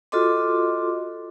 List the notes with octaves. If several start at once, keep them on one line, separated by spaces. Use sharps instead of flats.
F4 F#4 A4 D#5 C6 D6